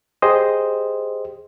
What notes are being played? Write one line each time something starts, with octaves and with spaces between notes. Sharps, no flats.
G4 G#4 C5 D#5